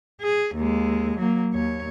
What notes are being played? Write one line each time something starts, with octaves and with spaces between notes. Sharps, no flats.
G#4
D#2 G#3
F#3 A#3
D#2 C#5